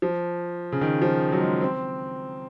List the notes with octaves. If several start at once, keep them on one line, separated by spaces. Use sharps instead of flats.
F3
C#3
D#3
F3
F#3
G#3
C4